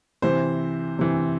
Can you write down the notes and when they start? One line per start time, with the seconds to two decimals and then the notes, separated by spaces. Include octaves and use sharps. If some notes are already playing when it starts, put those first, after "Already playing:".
0.22 C3 E3 C5
0.99 C3 E3